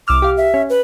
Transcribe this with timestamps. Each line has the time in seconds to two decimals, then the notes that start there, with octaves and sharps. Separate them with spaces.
0.08 C2 D6 E6 F6
0.22 G4 F5
0.37 E5
0.54 C#4
0.70 B4